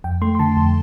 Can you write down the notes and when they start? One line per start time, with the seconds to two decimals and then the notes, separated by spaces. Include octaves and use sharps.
0.04 F2 G5
0.22 A3 C6
0.35 C6
0.39 D3 A5
0.57 F2